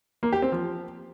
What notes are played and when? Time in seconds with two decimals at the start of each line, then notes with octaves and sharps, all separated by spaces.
0.23 A#3
0.33 G4
0.42 C4
0.52 F3